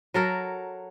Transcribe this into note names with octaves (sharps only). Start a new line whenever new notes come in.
F#3 A4 A#4